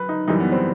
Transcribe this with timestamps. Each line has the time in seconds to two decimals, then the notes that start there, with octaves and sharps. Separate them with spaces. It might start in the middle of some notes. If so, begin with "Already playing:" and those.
Already playing: F#2 B4
0.09 D#4
0.28 F#2 E3 G3 D#4
0.40 B3
0.52 C4